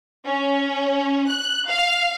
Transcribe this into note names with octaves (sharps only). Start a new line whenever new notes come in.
C#4
F#6
F5